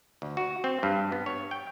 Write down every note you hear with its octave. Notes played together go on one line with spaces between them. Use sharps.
D2
F#4
C4
G2
B3
C#5
G5